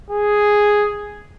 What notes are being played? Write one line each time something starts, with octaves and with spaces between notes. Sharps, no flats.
G#4